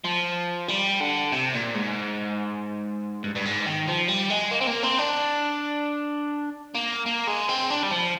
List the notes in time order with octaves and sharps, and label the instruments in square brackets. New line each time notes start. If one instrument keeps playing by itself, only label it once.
[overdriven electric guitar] F3
G3
D3
C3
A#2
G#2
G2
G2
G#2
D#3
F3
G3
G#3
A#3
C4
A#3
C4
D4
A#3
A#3
G#3
C4
D4
G3
F3